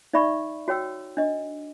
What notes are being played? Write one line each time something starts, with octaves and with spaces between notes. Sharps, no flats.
D#4 D5 E5 B5 C#6
F#4 C#5 G5 E6
D4 D#5